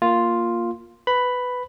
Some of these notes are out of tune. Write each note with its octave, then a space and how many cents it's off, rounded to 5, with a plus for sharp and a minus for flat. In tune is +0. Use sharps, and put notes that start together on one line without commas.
A#3 +0 F4 +0
B4 +10 B5 +5